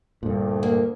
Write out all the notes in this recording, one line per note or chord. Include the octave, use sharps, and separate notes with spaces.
D2 G2 A#2
A#3